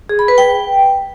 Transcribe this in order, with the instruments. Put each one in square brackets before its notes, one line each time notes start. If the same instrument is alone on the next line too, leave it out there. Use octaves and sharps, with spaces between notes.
[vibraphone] G#4
B5
B4
G5